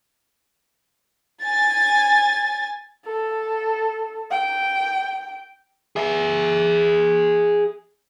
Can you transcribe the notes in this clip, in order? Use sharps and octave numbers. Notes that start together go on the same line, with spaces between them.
G#5 A6
A4
G5
G#4 E5